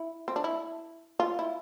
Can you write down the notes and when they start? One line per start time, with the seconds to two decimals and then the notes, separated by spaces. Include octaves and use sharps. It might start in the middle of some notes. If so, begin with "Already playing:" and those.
Already playing: E4
0.28 C4
0.36 D4
0.44 E4
1.20 F4
1.39 E4